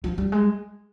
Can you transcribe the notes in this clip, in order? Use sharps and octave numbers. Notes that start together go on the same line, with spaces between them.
F3
G3
G#3